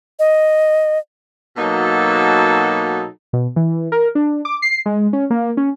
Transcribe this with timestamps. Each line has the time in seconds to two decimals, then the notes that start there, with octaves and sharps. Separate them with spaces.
0.19 D#5
1.57 B2 F#3 A#3 D#4 A4
3.33 B2
3.56 E3
3.92 A#4
4.15 D4
4.45 D6
4.62 C7
4.86 G#3
5.13 C#4
5.30 A#3
5.57 C#4